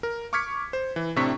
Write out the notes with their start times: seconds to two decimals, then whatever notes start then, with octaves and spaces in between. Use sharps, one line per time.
0.03 A#4
0.33 C#6 D6 F6 G#6 B6 C#7
0.73 C5
0.96 E3
1.16 A2 C3 C4 D4 C#6 B6